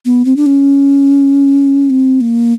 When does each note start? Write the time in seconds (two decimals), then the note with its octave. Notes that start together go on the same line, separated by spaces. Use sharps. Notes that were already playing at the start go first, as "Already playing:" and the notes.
0.05 B3
0.25 C4
0.36 D4
0.46 C#4
1.90 C4
2.21 A#3